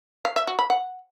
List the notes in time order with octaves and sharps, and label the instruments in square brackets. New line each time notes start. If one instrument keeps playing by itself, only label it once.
[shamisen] F5
E5
F#4
B5
F#5